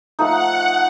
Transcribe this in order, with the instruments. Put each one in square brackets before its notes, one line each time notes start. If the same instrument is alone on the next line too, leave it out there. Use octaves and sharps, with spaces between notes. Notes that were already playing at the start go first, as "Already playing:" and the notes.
[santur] F3 A3 D#4 [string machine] F#5